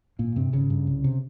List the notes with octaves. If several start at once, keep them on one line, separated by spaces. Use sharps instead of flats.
G#1 A#2 A#3
G2 C3 C4
G#1 C#3 C#4
G2
C2
C3